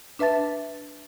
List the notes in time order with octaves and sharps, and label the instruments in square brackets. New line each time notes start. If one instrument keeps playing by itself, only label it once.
[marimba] D4 B4 E5 A5 A6